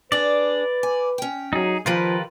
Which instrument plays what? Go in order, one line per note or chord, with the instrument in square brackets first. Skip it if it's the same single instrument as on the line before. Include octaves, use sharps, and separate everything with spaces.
[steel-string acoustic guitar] D4 G#4 [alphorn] B4 [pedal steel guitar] D5
[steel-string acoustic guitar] G#5
C#4 G5
[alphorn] F#3 [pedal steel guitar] D#4 G#4
[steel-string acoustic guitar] D#3 G3 G4 [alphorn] F3 [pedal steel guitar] F4 A#4 B4